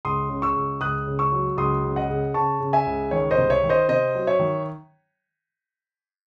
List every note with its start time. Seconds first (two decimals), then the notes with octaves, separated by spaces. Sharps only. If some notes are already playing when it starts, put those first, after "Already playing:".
0.05 C#2 C6 D#6
0.29 C#3
0.42 C#6 E6
0.56 C#2
0.81 C#2 D#6 F#6
1.07 C#3
1.19 C#6 E6
1.32 F#3
1.57 C#2 C6 D#6
1.84 C#3
1.96 D#5 F#5
2.10 C#3
2.34 C#3 A5 C#6
2.60 C#3
2.73 E5 G#5
2.86 C#2
3.11 D#3 C#5
3.31 C5 D#5
3.37 C2
3.50 C#5 E5
3.64 D#3
3.69 C5 D#5
3.88 C3 C5 D#5
4.15 F#3
4.27 C#5 E5
4.39 D#3